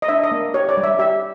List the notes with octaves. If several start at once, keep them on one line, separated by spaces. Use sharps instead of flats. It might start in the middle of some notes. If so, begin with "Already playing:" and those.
D#5
D4 E5
D#5
A#3
G4 C#5
D5
G3
E5
G4 E5